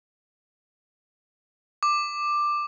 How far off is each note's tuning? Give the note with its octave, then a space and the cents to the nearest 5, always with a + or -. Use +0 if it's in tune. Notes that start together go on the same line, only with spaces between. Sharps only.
D6 +10